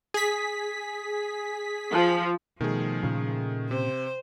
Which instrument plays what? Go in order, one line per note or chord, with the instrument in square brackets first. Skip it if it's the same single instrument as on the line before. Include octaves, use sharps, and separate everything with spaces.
[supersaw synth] G#4 B6
[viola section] F3
[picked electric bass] B2 [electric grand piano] D#3 A3 G#4 [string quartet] F3
[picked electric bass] A#2 C#3
[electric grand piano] C3 [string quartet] C5